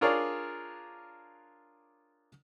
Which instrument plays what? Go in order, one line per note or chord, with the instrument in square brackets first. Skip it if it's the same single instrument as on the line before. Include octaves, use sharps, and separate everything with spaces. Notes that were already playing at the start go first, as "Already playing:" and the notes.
[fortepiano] D4 F4 G#4 A#4 C#5 D5